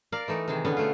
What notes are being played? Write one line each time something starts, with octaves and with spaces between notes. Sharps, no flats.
A#4 D5 F5
E3 A3 D#4
C3 D#3 E3 G#4
B2 D3 B3 C#4
A3 F4